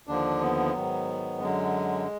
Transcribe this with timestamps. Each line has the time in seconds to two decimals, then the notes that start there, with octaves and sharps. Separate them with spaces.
0.07 D#2 D3 F3 D4
0.41 B3
0.74 G#2 D#3 F#3
1.40 F#2 D3 F#3 G#3